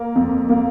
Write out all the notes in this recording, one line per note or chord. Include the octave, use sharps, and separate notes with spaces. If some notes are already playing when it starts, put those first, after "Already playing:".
Already playing: A#3
F2
A#3